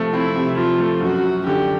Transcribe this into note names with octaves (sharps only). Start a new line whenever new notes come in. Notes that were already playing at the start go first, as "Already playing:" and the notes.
Already playing: C3 F3 A3 C4
C4 E4
C3
F3 F4
A3
F#2 F#4
F#2
D3 G4